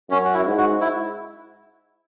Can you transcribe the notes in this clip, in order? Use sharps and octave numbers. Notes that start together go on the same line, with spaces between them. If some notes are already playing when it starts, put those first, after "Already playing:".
F#2 C#4
F#4
E4
G#2
F#4
E4